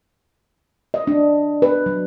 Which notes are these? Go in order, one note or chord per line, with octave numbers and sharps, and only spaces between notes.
D#5
D4
B4
F#3